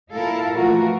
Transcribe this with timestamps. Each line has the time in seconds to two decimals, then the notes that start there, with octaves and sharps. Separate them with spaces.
0.13 A#2 E4 A4 A#4 F5
0.56 E3 F3 A3 F4 F#4 A#4